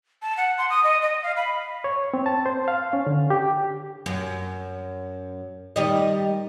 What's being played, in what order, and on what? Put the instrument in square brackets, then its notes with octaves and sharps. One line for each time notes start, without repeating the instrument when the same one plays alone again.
[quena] A5
F#5
C6
D#6
D#5
D#5
F5
B5
[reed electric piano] C#5
C4
A5
C5
F5
C#4
D3
G4
[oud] F#2
D#3 G3 D#5